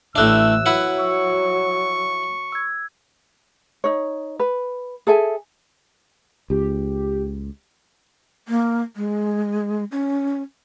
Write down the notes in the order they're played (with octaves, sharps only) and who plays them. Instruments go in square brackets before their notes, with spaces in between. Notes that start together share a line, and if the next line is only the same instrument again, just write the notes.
[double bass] A1 [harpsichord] A2 A3 D4 [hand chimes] E5 F#6 [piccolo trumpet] E6
[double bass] F#3 [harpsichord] E4 B4 F#5
[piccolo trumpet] C#6 [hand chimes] E6
[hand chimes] E6 G#6
[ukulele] D#4 C#5
B4
G#4 A4 E5 G#5
[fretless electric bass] C#2 [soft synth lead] G4
[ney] A#3
G#3
C#4